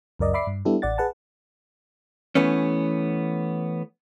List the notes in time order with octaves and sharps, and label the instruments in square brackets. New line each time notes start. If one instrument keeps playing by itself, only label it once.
[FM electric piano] C#2 F#2 A#4 D5 D#5
D5 E5 B5 D6 C7
G2
G3 B3 D4 E4 G4 A4
A1 D5 F#5 A6
G#4 B4 F#5 A5
[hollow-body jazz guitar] E3 A3 B3 C#4